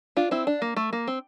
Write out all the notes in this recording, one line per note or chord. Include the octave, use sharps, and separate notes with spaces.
D4 F4
C4 E4
D4
A#3
A3
A#3
C4